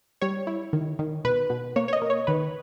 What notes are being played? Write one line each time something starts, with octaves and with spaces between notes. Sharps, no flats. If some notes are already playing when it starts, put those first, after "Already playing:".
G3 C#5
E4
D#3
D#3
B2 B4
B2
A#3 C#5
C#5
D#5
A#3
C#5
D#3 B4